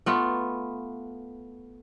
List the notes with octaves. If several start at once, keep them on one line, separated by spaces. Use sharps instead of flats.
A3 B3 F4